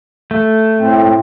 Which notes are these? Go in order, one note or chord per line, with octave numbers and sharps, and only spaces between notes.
A3
A2 C4